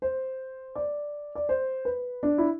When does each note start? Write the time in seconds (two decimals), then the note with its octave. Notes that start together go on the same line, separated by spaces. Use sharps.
0.02 C5
0.75 D5
1.35 D5
1.49 C5
1.85 B4
2.23 D4
2.38 E4